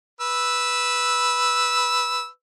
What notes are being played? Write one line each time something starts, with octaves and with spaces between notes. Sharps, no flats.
B4 E6